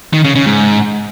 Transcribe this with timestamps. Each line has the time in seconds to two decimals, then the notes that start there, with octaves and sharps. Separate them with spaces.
0.13 D#3
0.24 C#3
0.35 C#3
0.46 G#2